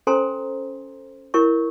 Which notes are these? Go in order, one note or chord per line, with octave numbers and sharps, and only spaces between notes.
C#4 A4 C5 G#5 A#5 C6
E4 A#4 C#5 C#6